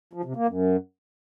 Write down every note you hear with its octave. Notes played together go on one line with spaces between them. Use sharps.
F3
C3
A#3
F#2